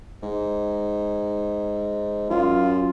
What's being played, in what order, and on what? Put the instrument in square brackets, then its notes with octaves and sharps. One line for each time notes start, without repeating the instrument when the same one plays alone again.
[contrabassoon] G#2
[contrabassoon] F#2 [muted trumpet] F4